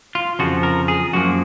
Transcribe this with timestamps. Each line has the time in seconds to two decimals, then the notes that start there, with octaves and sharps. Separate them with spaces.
0.15 F4
0.39 F2 C#3 F3 F#4
0.63 A#4
0.88 G#4
1.13 F#2 F3 A#3 F#4